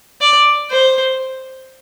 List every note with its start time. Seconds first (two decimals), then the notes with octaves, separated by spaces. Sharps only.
0.21 D5
0.71 C5